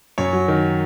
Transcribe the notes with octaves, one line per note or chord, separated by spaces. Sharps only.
F#2 C#5
F#3
D#3